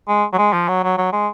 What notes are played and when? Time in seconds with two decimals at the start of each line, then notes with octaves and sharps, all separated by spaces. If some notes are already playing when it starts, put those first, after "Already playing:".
0.08 G#3
0.33 F#3
0.38 G#3
0.53 F3
0.68 F#3
0.83 F#3
0.98 F#3
1.12 G#3